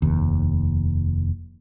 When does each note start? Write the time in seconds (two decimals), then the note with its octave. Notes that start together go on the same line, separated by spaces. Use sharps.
0.02 F1 D#2